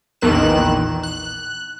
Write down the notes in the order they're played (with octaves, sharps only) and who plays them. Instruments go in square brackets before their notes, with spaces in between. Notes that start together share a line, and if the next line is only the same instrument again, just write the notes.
[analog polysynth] A#1 E2 D#3 F#6 E7
F#6